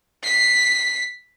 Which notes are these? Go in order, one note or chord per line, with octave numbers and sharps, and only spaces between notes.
B6 C7